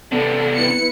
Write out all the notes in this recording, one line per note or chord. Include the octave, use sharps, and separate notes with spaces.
C3 B3 D4 A4
E4 B4 C#7